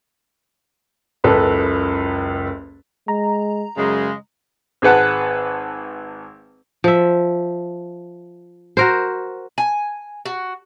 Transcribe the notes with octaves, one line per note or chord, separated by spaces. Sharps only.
F#1 C#2 A4 B4
G#3 A#5
F#2 C#3 G#3
G#1 G#4 B4 F#5 A5
F3 E5
F#4 A#4 C5
G#5
F#4